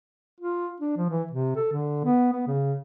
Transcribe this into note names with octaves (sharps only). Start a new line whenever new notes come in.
F4
D4
F3
E3
C3
A4
D3
B3
B3
C#3